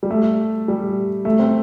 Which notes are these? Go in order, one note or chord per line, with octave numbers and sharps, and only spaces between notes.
G3
A3
G3
A3
C4